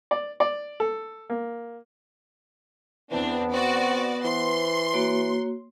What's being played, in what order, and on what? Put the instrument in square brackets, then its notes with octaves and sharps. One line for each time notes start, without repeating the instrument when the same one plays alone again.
[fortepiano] D5
D5
A4
A#3
[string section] E2 C4 D4 [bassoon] E3 [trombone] B3
[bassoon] C4 [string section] F#4 D5
[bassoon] E3 [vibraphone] C5 [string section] C6
[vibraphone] A#3 F#4 C#5